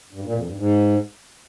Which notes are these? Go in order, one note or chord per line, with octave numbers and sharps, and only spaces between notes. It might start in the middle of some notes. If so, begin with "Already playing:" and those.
G2
A#2
F2
G2
G#2